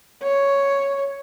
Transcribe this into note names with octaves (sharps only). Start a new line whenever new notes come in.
C#5